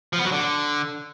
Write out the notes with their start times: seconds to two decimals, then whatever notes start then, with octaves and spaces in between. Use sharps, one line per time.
0.13 F3
0.19 B3
0.25 F#3
0.31 D3